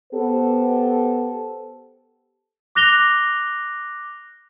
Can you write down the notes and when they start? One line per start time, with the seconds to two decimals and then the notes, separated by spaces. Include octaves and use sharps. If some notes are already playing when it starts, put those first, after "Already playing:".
0.13 B3 G4 A4 B4 C5
2.75 D6 F#6 A#6 F7 G7